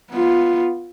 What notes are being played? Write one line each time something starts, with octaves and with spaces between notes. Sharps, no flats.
B3 F4